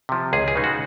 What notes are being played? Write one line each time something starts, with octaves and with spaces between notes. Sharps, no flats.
C3 F3
C#2 G#4
G#4
C#3 G#3 D#4
F#4